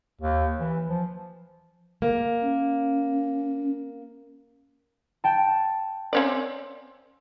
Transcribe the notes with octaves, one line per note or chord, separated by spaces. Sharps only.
D#2
E3
F3
A#3
C#4
G5 A5
C4 C#4 D5